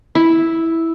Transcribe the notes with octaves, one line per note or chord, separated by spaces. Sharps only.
E4